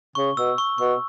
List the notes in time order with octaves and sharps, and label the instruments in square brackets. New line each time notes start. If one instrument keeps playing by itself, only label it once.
[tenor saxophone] C#3 [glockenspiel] C#6
[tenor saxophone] B2 [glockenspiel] E6
[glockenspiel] C#6
[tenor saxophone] B2 [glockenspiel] C#6